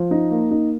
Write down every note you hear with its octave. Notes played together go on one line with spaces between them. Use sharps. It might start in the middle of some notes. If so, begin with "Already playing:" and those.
Already playing: F3
D#4
A#3
D#4